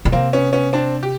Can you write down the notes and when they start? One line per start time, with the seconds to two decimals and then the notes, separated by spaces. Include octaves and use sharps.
0.05 B2
0.12 C3 A#3 C4
0.33 B3 C#4
0.53 B3 C#4
0.73 C4 D4
1.03 G4